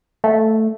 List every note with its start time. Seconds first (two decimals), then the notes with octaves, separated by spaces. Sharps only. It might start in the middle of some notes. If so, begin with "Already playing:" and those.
0.24 A3